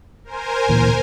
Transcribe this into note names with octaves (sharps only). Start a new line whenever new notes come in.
A#4 C5 G#5
D1 A#2 E3